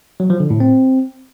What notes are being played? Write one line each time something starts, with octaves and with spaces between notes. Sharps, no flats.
F#3
F3
D3
A2
C4